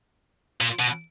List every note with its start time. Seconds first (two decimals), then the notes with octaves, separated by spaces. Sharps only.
0.61 A#2
0.80 B2